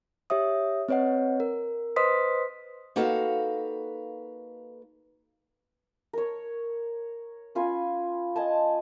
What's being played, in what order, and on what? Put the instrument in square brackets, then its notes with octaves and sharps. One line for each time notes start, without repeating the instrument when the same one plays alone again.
[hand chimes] G4 C#5 E5 D#6
C4 B4 C#5 D#5 F#5
A#4
B4 C5 D#5 C6 D#6 B6
[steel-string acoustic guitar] A#3 D#4 F#4 A4 B4 F5
[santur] A#4 C#5
C#4 F4 G#5 B5
D#5 G#5 A5